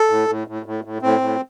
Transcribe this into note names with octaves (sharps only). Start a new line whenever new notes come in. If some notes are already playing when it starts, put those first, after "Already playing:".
Already playing: A4
A2
A2
A2
A2
A2
A2 C4
A2